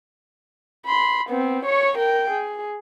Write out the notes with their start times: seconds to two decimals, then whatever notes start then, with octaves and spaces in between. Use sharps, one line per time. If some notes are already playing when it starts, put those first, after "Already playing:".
0.86 B5 C6
1.29 B3 C4
1.66 C#5 C#6
1.98 A#4 G5
2.30 G#4